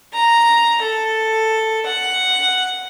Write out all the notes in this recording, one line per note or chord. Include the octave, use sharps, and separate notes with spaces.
A#5
A4
F#5